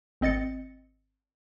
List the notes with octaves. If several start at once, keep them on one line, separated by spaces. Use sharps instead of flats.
G#1 C4 D#5 A6 C#7